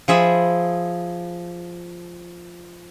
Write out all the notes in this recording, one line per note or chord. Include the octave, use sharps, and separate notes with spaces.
F3 G#4 E5 B5